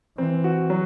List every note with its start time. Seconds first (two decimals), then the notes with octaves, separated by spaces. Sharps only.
0.18 E3 C4
0.44 F#4
0.70 F#3